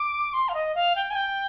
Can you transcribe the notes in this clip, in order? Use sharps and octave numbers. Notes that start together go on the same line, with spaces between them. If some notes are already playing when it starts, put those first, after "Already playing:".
Already playing: D6
C6
F5
D#5
F5
G5
G#5
G5